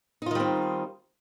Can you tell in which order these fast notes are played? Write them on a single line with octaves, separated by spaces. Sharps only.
D#4 F4 D#3 G3 C4